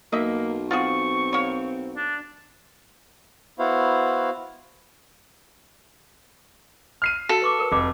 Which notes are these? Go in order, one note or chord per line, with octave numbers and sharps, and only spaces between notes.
B1 A#3 D#5 E5
C4 F4 F#4 G#4 C#6
A#3 C#5
D4
B3 E4 F#4 C5 F5
F6 C7 D#7
F#4 A4 F5 C6
B4 C#6 D6
A#4 B4
F1 F5 D6